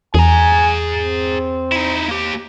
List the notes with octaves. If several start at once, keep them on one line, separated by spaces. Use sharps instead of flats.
E2 G#4 G#5 A#5
C4
D#4 E4
A#3 G4